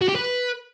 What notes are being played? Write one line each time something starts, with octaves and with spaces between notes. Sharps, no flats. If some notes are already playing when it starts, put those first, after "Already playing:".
F#4
G4
B4